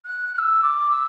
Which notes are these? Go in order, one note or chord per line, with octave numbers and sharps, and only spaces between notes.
F#6
F#6
E6
D6
E6